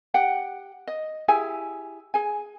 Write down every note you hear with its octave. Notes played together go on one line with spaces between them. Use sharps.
G4 F#5 G5
D#5
E4 G4 G#4 G#5
G#4 G#5